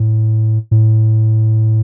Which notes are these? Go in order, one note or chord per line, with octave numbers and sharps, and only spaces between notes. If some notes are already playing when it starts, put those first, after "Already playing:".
Already playing: A2
A2